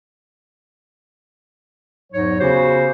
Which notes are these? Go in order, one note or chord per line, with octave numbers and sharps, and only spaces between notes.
E2 G#2 F#3 D#4 C#5
C#3 B3 C#4 F#4 G4 C5